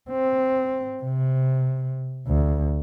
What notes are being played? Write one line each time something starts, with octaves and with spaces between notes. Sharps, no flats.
C4
C3
D2